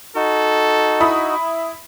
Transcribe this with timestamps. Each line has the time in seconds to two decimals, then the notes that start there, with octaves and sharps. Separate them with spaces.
0.16 D#4 F#4 A4
1.00 E4 B5 D#6